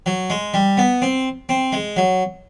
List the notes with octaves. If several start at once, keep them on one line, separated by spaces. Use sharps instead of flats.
F#3
G#3
G3
B3
C4
C4
G#3
F#3